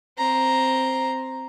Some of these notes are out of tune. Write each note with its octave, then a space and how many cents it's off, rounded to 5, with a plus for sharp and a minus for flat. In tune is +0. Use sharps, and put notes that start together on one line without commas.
C4 +0 A#5 +0